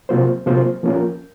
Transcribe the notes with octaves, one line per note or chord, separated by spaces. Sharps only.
C3 F#3 A#3 F4 C5
C3 F#3 A#3 F4 C5
F3 A#3 C#4 F4 A#4